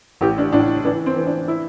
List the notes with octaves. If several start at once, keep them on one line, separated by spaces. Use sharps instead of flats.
A1 G4
D4
A2 D4
E3 D4
C4
E3
D4
E4